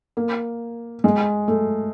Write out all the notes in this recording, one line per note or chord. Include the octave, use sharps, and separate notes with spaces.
A#3
G#3
A3